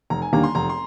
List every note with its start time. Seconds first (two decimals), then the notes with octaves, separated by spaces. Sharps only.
0.10 F1 A#5
0.22 G#5
0.33 D#2 D3 G3 A#3 A#5
0.44 C6
0.55 F1 A#5
0.69 C6